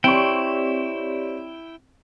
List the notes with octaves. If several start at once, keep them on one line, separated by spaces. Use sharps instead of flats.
C4 E4 G4 C#5 D5 G5 C6 C#6